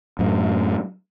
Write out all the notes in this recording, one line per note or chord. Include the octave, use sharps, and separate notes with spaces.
F#2 A2